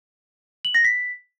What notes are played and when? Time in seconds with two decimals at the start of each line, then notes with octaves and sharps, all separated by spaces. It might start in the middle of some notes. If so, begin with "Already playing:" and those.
0.65 F#7
0.75 A#6
0.84 B6